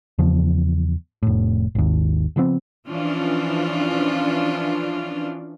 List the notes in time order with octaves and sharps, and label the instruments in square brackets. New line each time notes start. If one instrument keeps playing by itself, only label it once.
[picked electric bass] E2 C#3 F3
F1 A2
G#1 D#2
C#3 F3 B3 C4
[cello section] E3 F3 C#4 D4 F4